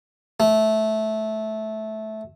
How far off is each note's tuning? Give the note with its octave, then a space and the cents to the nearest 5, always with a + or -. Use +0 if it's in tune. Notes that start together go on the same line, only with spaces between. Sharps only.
A3 -15